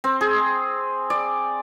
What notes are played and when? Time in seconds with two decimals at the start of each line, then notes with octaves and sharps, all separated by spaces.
0.04 C4
0.21 G#4
1.10 D5